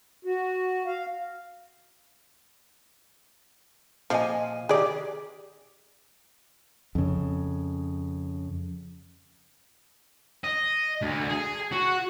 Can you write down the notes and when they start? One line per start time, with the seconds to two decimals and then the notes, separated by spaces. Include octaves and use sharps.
0.25 F#4
0.86 F5
4.10 A#2 F3 D#5 G#5
4.69 D#3 G4 G#4 D5
6.95 F2 C#3
10.44 D#5
11.02 D2
11.29 G#4
11.71 F#4